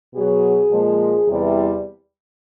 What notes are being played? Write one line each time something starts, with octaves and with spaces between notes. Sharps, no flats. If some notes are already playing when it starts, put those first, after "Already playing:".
B2 F#3 G#4
A#2 F3 G#3
E2 C3 E3 G3